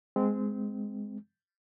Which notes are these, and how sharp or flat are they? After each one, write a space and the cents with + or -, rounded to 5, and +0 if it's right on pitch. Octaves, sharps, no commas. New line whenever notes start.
G#3 +0 C4 -20